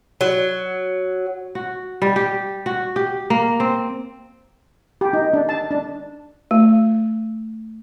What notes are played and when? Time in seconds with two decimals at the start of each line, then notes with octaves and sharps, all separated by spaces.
0.21 F#3
1.55 F#4
2.02 G3
2.16 G4
2.66 F#4
2.96 G4
3.30 A#3
3.60 C4
5.01 G4
5.13 D#4
5.33 D4
5.49 A5
5.71 D4
6.51 A3